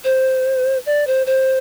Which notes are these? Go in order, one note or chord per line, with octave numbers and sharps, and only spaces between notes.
C5
D5
C5
C5